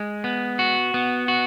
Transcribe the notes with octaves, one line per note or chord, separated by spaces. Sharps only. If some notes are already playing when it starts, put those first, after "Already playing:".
Already playing: G#3
B3
F#4
B3
F#4